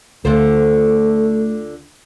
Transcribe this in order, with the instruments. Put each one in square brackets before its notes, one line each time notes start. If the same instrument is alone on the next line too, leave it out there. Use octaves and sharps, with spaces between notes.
[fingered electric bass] D2 [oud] D3 F4 C5 [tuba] A3